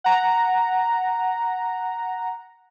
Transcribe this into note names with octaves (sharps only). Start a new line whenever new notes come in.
F#5 A#5